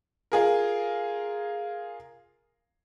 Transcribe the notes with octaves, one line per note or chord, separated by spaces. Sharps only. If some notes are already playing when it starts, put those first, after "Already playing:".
F4 G#4 A#4